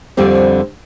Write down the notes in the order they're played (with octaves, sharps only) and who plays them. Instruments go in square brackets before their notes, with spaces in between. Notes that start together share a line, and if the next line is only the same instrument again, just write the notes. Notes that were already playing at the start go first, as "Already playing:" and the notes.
[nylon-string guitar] F2 D3 G3 C4